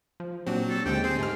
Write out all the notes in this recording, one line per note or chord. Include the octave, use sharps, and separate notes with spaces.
F3
A#2 F#3 C4 D4 F#4 G4
A4
D#2 D3 G#3 C4 G4 G5
C4 G#4 C6
G#2 C3 A3 F6